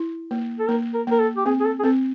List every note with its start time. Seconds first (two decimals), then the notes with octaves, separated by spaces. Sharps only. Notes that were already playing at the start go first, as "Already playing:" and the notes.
Already playing: E4
0.31 A#3
0.59 A4
0.69 A#3 A#4
0.94 A#4
1.07 A#3 A#4
1.20 A4
1.37 G4
1.46 C4 G#4
1.60 G#4
1.65 A4
1.79 G#4
1.83 C4 A4